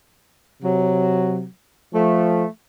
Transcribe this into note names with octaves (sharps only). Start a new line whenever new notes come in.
C3 F#3
F3 A3